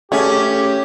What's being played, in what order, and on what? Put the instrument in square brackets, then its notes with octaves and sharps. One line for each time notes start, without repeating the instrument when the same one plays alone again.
[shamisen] A3 G#4 [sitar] C#4 [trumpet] G4